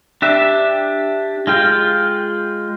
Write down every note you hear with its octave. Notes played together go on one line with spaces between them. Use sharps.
D4 G4 E5
G#3 F4 G5